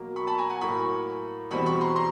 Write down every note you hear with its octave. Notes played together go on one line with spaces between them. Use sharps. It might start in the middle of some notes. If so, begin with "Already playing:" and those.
Already playing: B2 F#3 A#3
B5 C#6
A5 B5
G#5 A#5
F#5 G#5
A2 F#3 A#3 B5 C#6
E2 B2 G3 C4 B5 C#6
B5 C#6
A#5 C6
A#5 C6